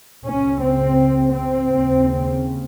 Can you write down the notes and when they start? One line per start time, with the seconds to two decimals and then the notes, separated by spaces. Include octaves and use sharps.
0.25 C#2 C#3 C#4
0.61 C4
1.32 C4
1.66 D#2 C#3